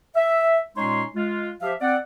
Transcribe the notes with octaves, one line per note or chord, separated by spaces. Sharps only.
E5
A#2 G#3 C#4 D#4 C#5 C6
G#3 F4
F3 G4 E5 F5
C4 D5 F#5